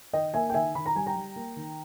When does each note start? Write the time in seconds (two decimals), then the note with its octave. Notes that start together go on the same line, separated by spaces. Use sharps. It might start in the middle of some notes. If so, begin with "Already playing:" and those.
0.13 D#3 D#5 G5
0.34 A#3 E5 G#5
0.50 G5
0.54 D#3 E5 G#5
0.75 D#3 B5
0.86 A#5
0.95 G3 G#5
1.06 G5 A#5
1.16 G3
1.36 A#3
1.56 D#3